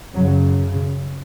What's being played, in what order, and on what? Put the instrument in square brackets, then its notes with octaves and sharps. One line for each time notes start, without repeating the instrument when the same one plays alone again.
[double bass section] F#2 C#3 F#3